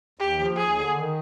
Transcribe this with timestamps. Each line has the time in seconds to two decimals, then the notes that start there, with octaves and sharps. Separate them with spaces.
0.19 D#2 G4
0.38 F3
0.57 D#2 G#4
0.75 D3
0.94 D#3